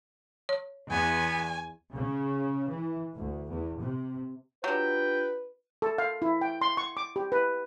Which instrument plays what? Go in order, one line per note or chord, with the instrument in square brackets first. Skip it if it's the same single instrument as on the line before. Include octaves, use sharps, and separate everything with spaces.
[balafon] C#5
[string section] E2 [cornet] B3 [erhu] G#5
[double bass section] C#3
E3
D2
E2
C3
[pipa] D3 F#3 [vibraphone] D4 F4 G4 [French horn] B4 [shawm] G5
[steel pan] A4
F5
E4
G5
C6
C#6
D6
G4
B4